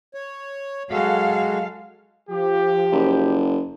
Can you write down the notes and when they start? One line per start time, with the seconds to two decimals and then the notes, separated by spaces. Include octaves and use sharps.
0.14 C#5
0.91 F#3 G#3 F#4 A4 F5
2.30 F3 G4
2.92 F#1